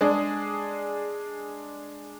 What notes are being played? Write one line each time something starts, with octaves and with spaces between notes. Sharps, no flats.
G#3 D4 G#4